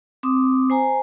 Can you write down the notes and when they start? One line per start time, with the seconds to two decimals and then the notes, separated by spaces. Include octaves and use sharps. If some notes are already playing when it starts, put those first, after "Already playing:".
0.23 C4 D6 D#6
0.70 C5 G#5 A#5